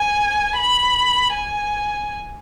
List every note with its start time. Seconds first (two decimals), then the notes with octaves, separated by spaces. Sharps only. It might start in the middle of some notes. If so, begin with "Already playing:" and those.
Already playing: G#5
0.56 B5
1.33 G#5